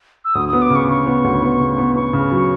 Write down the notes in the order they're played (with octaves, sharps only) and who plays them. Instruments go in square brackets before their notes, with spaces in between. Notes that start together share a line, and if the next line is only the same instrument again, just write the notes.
[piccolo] E6
[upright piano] D2 [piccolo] D#6
[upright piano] B3 [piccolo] D#6
[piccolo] D6
[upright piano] C#3
[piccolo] C#6
[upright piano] C#3 [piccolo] C#6
[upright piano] B3
D2
B3
C#3
B3
[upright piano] B3 [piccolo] C#6
[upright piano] C#3
F#3